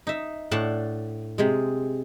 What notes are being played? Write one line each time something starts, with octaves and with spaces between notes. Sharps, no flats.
D#4 E5
A2 D4 F#5 A5
C3 G#3